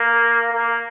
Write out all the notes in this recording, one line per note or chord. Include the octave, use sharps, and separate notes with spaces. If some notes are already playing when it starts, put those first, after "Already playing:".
Already playing: A#3
A#3